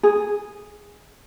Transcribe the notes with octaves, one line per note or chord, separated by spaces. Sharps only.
G#4